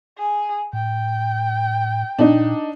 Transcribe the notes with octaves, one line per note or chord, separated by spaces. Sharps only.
G#4
A2 G5
A#2 D4 D#4